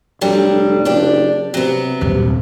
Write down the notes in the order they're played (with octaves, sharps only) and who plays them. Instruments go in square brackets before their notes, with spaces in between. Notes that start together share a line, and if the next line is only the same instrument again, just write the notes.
[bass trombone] F1 [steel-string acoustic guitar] D3 F#3 G3
[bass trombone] F#1 [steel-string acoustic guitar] D4 G4 D5
[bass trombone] C3 [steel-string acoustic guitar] F#3 B3
[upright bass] D#1 G2 [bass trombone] C3